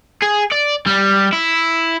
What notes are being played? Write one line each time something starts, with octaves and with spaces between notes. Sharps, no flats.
G#4
D5
G3
E4